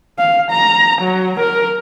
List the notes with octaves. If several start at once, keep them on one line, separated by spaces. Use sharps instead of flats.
F5
A#5
F#3
A#4